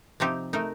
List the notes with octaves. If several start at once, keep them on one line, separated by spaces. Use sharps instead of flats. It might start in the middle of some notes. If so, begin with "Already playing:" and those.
C3 F3 C4 D#4 G4
A3 D#4 A#4